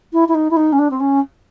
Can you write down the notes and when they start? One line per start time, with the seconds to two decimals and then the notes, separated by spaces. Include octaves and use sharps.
0.13 E4
0.28 E4
0.34 D#4
0.50 E4
0.56 D#4
0.72 C#4
0.78 D4
0.90 C4
1.00 C#4